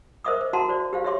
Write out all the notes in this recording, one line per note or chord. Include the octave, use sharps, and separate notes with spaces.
A#4 C5 D#5 E5 D6 D#6
C5
F#4 F#5 A5 A#5 C6
F#4 C5 D5
G4 C5 F5
G4 C#5 E5 C6 D6